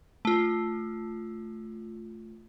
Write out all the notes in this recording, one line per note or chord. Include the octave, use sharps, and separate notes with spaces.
A3 F4